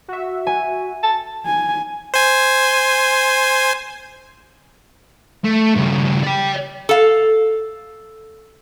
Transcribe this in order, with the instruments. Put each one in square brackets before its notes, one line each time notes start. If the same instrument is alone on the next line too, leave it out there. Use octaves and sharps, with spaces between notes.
[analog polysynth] F#4 E5
[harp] G#5
[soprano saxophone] A5
[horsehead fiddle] G#5
[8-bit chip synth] C5 G#5
[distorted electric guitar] A3
G2 C#3
D5 G5
[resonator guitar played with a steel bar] A4 F5